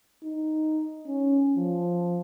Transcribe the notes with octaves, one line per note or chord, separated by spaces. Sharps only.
D#4
C#4
F3